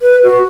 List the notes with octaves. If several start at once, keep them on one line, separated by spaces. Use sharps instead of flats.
B4
F#4